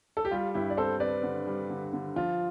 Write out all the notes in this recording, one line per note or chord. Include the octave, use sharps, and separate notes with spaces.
A4
G4
G3 F4
G2 E4 G4
D5
C4 A4 C5
C4 B4 D5
D3
G3
D3
D3
F3 F4